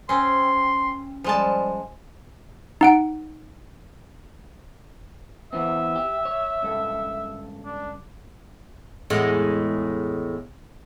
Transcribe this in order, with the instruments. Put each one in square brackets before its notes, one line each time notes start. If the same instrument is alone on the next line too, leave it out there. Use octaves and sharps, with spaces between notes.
[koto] C4 C#4 [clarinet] C6
[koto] F3 G#3 A5 [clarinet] G3
[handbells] D#4 F#5 D7
[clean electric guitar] E3 B3 C4 [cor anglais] E5
[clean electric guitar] G4
C#5
C#2 G2 A4
[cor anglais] D4
[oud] E2 A2 G#3